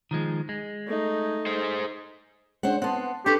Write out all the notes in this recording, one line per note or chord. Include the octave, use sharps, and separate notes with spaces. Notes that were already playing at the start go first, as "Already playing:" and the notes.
D#3 F3 G#3
G#3
A3 D#4
G#4 C5
G#3 C#4 D4 C5 F#5
B3 C4 F#5 A5 C6
D4 G4 A4 B4 C6 C#6